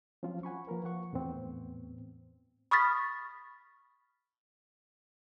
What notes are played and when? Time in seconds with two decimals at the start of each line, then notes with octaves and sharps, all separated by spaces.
0.23 F3 F#3 C4 C#4 F4
0.43 F#5 G#5 B5 C#6
0.67 F3 A#3 A#4 B4
0.84 F3 F4 F#5 C#6
1.13 E2 A2 B3 C4
2.71 B5 C#6 D#6 F6 A6 B6